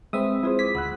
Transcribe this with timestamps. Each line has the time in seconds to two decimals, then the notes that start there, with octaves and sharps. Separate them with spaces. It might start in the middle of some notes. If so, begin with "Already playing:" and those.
0.13 G#3 C4 B4 C5 E5 D#6
0.43 G#3 E4 F4 G#4 C5
0.59 D6 G#6 B6
0.75 D2 F#5 B5 E6 F#6